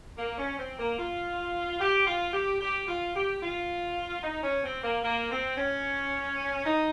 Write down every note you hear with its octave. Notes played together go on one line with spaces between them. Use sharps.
A#3
C#4
C4
A#3
F4
G4
F4
G4
G4
F4
G4
F4
D#4
C#4
C4
A#3
A#3
C4
C#4
D#4